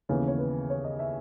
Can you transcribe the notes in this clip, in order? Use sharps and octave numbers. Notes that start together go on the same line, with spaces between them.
D#2 C#3 E3 B3
C#5
B4
C#5
D#5
E5